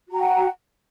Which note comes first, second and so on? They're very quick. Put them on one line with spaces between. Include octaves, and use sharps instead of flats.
F#4 A#5 G5 F#5